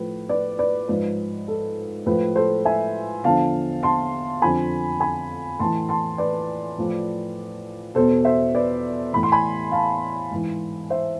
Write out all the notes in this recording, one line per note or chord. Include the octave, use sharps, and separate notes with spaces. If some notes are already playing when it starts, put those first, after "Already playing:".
Already playing: A2 F3 B4
B4 D5
B4 D5
G#2 F3 B4
A4
A2 F3 B4
A4 C5
E5 G#5
E2 D3 F3 F5 A5
A5 C6
F2 D3 F3 G#5 B5
G#5 B5
A2 E3 A5 C6
A5 C6
B4 D5
A2 F3
E2 B2 A4 C5
C5 E5
B4 D5
A2 E3 B5
C6
G#5 B5
F5 A5
G#2 E3
C5 E5